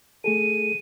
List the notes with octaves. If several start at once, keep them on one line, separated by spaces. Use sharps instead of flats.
A3 G#4 A4 D#7